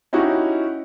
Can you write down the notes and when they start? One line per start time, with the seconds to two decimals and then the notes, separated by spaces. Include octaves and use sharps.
0.13 C#4 D#4 E4 F#4 G4